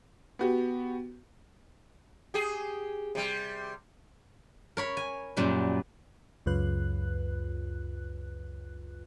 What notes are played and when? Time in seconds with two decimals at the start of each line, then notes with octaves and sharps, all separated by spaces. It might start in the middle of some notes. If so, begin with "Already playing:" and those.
0.39 B3 F#4 G4
2.34 G4 G#4
3.15 C3 G3
4.77 A#4 C#5 B5
4.97 G#5
5.37 F#2 A#2 F#3 G3
6.46 C#2 F#2 F4 B4 F#6